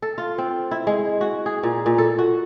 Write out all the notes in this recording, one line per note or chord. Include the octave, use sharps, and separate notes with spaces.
A4
F4
C4
E4
G#3
F#4
G#4
A#2
A#2
A4
F#4